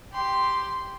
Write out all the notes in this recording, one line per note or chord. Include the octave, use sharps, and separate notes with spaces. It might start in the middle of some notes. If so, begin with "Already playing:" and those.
G4 C6